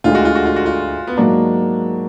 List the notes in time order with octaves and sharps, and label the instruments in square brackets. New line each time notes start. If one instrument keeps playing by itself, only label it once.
[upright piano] D2 D3 G#3 [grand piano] F4
[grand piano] F#4
F4
F#4
F4
F#4
F4
B3
[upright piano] G#2 F#3 A#3 [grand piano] D4